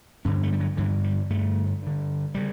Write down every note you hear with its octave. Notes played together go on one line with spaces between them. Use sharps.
G2 D3 C#4
A3
G3
F#3
G2 D3 E3
G3
G2 D3 A3
G2 D3
C#3 G3